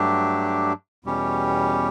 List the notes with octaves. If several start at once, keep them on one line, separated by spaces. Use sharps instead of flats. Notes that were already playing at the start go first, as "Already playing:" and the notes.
Already playing: G2 F#3 A3 D4 G4
E2 B2 G3 C#4 G4